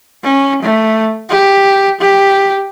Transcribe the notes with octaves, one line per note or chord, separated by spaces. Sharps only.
C#4
A3
G4
G4